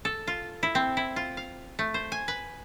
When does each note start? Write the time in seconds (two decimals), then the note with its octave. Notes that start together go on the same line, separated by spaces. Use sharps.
0.05 A4
0.27 F4
0.63 E4
0.75 C4
0.97 E4
1.16 F4
1.37 F5
1.79 A3
1.94 C5
2.12 G#5
2.28 B4